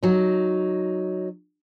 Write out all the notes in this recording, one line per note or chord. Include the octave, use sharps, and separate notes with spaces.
F#3 D#4